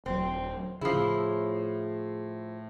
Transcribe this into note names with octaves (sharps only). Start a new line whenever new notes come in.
D#1 F#3 C4
C#3 F3 E4 G#4 C7
A2